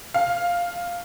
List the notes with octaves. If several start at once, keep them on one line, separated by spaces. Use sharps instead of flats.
F5